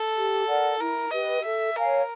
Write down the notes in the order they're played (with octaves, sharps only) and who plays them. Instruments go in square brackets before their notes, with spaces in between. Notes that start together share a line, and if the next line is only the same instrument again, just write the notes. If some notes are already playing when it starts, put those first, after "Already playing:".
Already playing: [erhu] A4
[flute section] G4
A#4 D5 F#5
[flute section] E4 [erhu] A#4
[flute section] G4 B4 [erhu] D#5
[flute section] A4 [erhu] E5
[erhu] A#4 [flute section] C#5 F5 G#5